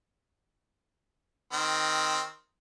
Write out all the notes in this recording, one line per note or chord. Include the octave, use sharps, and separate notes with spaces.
D#3 C4